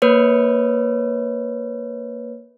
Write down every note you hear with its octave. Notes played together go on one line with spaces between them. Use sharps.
A#3 B4 C#5